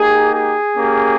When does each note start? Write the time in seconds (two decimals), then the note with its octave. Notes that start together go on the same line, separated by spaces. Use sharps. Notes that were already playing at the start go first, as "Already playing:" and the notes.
Already playing: A#3 D#4 G4 G#4
0.32 G#4
0.76 A#3 C#4 G4